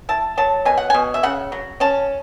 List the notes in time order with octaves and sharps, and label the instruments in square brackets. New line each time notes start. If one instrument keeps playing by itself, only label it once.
[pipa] E4 A5
F#3 A5
B2 G#5
F#5
B2 G#5
E5
C#3 F#5
F#3
C#4 A5